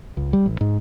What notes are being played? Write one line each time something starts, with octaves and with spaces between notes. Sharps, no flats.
C#2
G3
A1
G#2